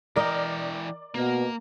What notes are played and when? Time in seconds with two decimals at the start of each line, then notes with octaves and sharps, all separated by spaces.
0.16 E3 A#4 D5 D#5 G5
1.15 B2 A#3